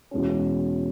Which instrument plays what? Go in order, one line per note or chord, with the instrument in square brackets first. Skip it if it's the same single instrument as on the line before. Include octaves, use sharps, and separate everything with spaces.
[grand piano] E2 B2 G#3 C#4